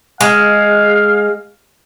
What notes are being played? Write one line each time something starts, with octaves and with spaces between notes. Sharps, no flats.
G#3 F5